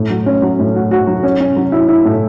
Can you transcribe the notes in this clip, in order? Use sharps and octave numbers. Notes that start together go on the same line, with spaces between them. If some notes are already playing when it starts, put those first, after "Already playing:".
Already playing: A2
F#3
C#4
F#3
A2
F#4
F#4
F#3
C#4
C#4
F#3
E4
E4
A2